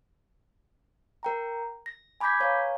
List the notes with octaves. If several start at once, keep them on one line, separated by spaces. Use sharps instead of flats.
A#4 G5 A#5
A#6
G#5 B5 D6 G6 G#6 B6
B4 C#5 F5 G#5 A#5